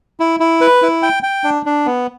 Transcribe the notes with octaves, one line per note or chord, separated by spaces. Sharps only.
E4
E4
B4
E4
G5
G5
D4
D4
B3